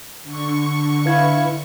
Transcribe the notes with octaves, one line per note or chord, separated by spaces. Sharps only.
D3 C#6
E4 B4 F5 G#6